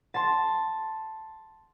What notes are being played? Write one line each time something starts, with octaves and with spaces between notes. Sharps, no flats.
A5 C6